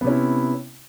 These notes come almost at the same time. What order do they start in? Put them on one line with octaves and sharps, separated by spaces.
B3 C3 C#4 E4